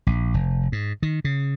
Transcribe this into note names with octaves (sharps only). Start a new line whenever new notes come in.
A#1
F1
G#2
D#3
C#3